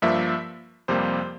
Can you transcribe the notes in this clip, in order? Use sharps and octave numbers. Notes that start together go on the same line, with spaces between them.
G2 F3 A#3 E5
F2 C3 G3 A#3 C5